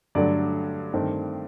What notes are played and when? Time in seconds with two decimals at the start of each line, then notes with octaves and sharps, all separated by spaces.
0.15 G2 D3 F#3 A3 D5
0.94 G2 D#3 A3 C4